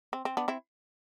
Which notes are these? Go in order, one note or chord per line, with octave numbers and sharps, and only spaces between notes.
C4
C4
B3 D4
C4 E4